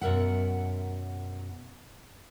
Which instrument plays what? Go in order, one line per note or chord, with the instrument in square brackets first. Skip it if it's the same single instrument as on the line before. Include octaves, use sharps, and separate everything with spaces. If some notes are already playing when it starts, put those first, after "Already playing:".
[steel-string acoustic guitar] F#2 B2 A#4 E5 F#5